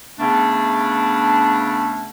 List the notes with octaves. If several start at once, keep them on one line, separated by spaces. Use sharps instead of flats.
C#3 A3 B3 C#4 D4